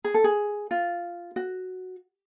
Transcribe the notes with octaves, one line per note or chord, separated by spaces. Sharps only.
G#4
A4
G#4
F4
F#4